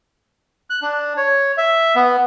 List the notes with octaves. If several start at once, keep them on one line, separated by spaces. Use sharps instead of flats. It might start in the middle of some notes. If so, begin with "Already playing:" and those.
F#6
D4
C#5
E5
B3